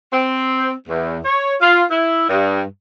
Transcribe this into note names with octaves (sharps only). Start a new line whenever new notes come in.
C4
E2
C#5
F4
E4
G2